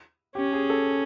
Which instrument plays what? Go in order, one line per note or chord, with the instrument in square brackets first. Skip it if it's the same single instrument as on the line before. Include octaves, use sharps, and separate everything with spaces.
[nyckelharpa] C#4 [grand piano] G4
[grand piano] G#4
A4